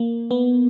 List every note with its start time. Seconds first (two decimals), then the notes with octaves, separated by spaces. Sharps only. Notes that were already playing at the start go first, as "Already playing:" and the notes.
Already playing: A#3
0.31 B3